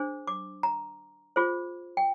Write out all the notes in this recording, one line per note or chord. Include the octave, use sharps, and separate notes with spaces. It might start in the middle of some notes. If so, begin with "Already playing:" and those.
Already playing: D4 G#4 C5
D6
A#5
F4 G#4 C5
G5